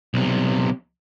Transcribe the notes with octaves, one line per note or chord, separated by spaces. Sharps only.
B1 C3